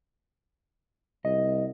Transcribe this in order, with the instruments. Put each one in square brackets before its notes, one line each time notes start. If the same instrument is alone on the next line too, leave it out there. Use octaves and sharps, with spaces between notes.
[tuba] C2 [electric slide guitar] D#5